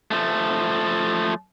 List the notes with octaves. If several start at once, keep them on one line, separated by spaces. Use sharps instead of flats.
F3 A3